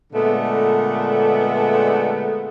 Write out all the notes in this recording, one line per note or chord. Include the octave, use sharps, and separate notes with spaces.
A#2 D3 G#3 A3 B3